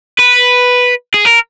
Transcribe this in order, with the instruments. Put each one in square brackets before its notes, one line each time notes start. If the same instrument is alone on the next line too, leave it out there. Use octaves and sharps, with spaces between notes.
[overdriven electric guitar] B4
G#4
A#4